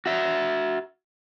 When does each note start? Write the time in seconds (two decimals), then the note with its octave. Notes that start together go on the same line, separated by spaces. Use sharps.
0.06 F#4 E5